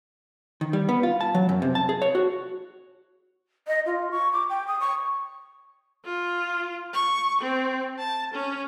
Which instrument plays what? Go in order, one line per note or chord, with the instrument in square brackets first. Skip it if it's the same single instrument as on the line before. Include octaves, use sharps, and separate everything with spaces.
[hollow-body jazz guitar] D#3
G3
B3
F4
A5
F#3
F#2
C3
A5
G#4
C#5
F#4
[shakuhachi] D#5
F4
C#6
D6
G5
D#6
C#6
[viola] F4
C#6
C4
A5
C#4